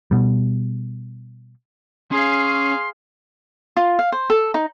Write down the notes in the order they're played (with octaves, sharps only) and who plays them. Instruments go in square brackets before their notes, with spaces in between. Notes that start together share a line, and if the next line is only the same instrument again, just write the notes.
[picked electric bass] B2 G3
[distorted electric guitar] C#4 [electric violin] G#4 F5 [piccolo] C6
[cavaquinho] F4
F5
C5
A4
D#4